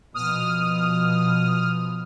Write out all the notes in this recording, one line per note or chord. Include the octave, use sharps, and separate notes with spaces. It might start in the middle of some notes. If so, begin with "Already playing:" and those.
B2 F3 D#6 F6